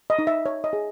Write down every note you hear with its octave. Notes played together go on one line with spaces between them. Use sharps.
D#5
D#4
E5
C#5
D#5
G#4